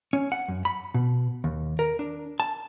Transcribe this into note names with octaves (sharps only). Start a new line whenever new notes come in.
C#4
F#5
F#2
B5
B2
D#2
A#4
D4
A5